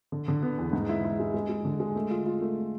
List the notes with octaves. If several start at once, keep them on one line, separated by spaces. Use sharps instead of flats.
D3
D3
B3
E2
G#2
E4
E4
G#3
G#3
G#3
D3
G#3
A3
F4
F4
A3